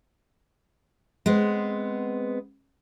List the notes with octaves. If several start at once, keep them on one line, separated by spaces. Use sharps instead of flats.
G#3 B3 C4